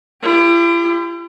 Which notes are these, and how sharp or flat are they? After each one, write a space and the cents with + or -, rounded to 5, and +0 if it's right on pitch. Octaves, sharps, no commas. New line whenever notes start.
E4 +45 G4 +30